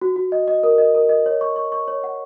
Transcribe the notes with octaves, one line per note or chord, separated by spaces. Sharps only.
F#4
F#4
D#5
D#5
A#4
D#5
A#4
D#5
C#5
C#6
C#6
C#6
C#5
F#5